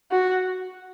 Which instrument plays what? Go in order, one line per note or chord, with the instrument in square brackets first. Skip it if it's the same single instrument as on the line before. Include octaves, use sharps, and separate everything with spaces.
[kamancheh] F#4